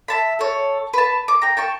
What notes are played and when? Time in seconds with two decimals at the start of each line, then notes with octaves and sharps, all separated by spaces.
0.08 E5 A5 B5
0.39 A4 C#5
0.94 B4 A5
1.28 D6
1.42 G5 A#5
1.57 G5 A5 C#6